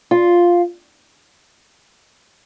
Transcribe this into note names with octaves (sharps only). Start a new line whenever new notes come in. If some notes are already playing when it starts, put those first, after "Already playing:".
F4